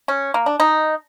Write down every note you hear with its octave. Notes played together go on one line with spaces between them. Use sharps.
C#4
A#3
D4
D#4